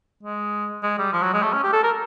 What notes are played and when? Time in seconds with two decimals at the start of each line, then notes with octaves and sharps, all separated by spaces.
0.23 G#3
0.83 G#3
0.98 G3
1.13 F3
1.23 F#3
1.34 G#3
1.43 A3
1.53 C#4
1.64 G4
1.73 A4
1.83 A#4